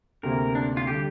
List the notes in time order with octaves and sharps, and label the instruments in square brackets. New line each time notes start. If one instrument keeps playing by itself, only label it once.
[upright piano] D2 C3 A#3 [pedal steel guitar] A#4
[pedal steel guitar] D4
F4
[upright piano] D3 G3 [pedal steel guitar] G4